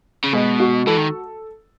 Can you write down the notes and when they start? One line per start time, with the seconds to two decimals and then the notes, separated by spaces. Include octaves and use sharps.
0.24 C#3
0.33 B2 G#3
0.60 F#4
0.87 E3 A4
0.97 D#3